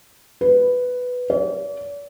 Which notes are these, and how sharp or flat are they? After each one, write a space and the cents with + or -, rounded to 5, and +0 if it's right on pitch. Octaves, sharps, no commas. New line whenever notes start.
B4 +5
D5 -45